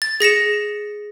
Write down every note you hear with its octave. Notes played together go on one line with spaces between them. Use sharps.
A6
G#4 A#6 C#7 E7